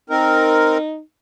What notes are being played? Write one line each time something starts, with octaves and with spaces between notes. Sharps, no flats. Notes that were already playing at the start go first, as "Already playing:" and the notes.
C4 D#4 A#4